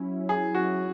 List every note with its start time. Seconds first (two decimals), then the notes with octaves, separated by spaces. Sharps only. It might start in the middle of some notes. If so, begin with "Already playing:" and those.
Already playing: F#3 C#4 E4
0.29 G#4
0.55 F#4